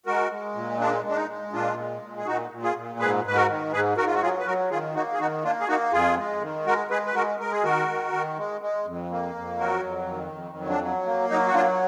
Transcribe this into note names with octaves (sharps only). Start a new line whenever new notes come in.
G#3 F#4 A#4
G#3
A#2
G#3 D4
G#3 D4
D#4
G#3
A#2 D4 F4
G#3
A#2
G#4
A#2 D#4 F#4
A#2
F4 G#4
A#2
G#2 G#4 B4
G#2 B4
F#4 A#4
D#3
G#2 G#4 B4
G#2 F#4 A#4
F4
F#4
F#3 F4 G#4
B4
F#3 F#4 A#4
D#3 F4 G#4
A#3 D#4 F#4
G#4
D#3 D#4 F#4
A#3 D4 F4
G#4
A#3 D#4 F#4
F2 F4 G#4
G#3
D#3
G#3 F#4 A#4
G#3 G#4 B4
B4
G#3 F#4 A#4
G#3 A#4
G#4
D#3 F#4 A#4
D#3
D#3
G#3
G#3
F2
A#3
F2
F#3 F#4 A#4
F2
D#3
F2
F#3
D4
F#3
A#3
F#3 D#4
F#4
F#3 D4 F4